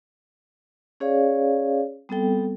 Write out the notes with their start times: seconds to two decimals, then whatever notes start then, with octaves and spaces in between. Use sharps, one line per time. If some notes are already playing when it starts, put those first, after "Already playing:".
1.00 C#4 G#4 C#5 D5 F5
2.09 G3 B3 C4 A4 G5